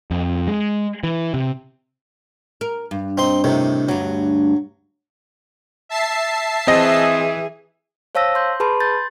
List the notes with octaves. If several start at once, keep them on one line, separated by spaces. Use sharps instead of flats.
F2
G#3
E3
C3
A#4
G2
C4 D#4 C6
A2 C3 D#3
D2 G2 F#3
E5 A5 C7
E3 C4 G#4 D#5 A#6
C5 C#5 F5 A5 E6 A#6
C6 G6
G#4 B4 A5 B5 C6
C6 G6 A6